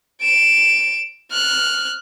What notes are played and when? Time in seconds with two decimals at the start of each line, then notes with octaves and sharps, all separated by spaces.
0.22 D7 E7
1.32 F6 F#6